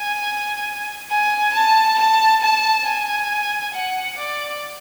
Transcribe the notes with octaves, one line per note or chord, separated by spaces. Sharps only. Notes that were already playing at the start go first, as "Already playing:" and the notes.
Already playing: G#5
G#5
A5
A5
A5
G#5
F#5
D5